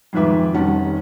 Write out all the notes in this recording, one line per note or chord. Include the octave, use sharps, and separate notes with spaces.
F2 G#2 D#3 B4 E5 D6
F1 D#3 G3 C#4 F#5 A5